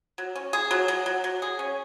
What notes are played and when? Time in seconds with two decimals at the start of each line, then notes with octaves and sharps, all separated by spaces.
0.18 F#3
0.35 C#4
0.53 G#4
0.71 F#3
0.88 F#3
1.06 F#3
1.24 F#3
1.42 G#4
1.59 C#4